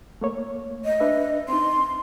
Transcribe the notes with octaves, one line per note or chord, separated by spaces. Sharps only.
A3 A#3 C#5
D#5
D4 B4 E5
C4 D#4 C6